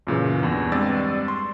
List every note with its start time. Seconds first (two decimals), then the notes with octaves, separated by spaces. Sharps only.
0.07 F#2 A#2 C#3 E3
0.43 E2 G2
0.72 G2 G#3 C4 D5 E6 A6
1.28 C6